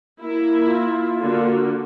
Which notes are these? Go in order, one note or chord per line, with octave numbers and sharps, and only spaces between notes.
A#3 E4
F4
D3 A#3 F#4